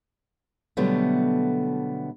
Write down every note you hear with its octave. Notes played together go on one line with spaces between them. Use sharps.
B2 D3 F#3 G3 A3 B3